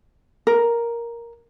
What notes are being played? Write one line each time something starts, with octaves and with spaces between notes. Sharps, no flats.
A#4